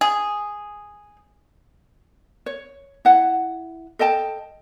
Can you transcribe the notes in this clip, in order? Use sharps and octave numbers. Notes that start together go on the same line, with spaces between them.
G#4
C#5
E4 F#5
A4 D#5 G5 A5